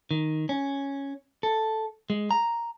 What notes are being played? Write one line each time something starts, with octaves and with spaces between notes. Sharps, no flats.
D#3
C#4
A4
G#3
A#5